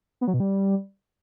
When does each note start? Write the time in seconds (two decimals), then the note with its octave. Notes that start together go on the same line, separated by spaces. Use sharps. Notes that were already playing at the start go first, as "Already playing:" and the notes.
0.21 B3
0.27 F#3
0.34 B2
0.40 G3